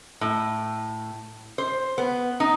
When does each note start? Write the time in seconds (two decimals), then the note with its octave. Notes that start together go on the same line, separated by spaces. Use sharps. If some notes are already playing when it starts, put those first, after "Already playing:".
0.21 A2
1.58 C5
1.98 B3
2.40 D#4